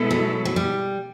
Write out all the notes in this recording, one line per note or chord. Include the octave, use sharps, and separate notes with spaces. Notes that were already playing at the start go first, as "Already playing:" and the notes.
Already playing: B2 G#3 B3 E4 A4
F#3
F#3
G3